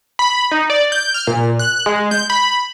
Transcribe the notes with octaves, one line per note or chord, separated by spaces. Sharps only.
B5
D#4
D5
G6
F6
A#2
F#6
G#3
G6
B5